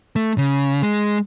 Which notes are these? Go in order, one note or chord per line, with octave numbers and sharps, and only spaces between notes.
A3
C#3
G#3